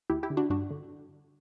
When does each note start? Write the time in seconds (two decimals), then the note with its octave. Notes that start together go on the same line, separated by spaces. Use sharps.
0.10 D2 E4 G4
0.23 E4 G4
0.30 D3
0.37 D4 F#4
0.50 G2 D4 F#4
0.70 D3